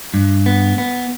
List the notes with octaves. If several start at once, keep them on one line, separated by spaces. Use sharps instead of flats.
G2
B3
B3